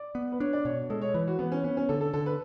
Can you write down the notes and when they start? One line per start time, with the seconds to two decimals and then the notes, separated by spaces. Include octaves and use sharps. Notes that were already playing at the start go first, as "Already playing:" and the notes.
Already playing: D5
0.15 B3
0.32 B4
0.40 D4 C#5
0.53 D5
0.65 B2 C#5
0.90 G#3 A4
1.02 C#5
1.14 E3 B4
1.27 F#4
1.39 E3 B3
1.52 C#4
1.64 B3 C#4
1.77 C#4
1.89 D3 A4
2.01 A4
2.13 D3 A4
2.26 B4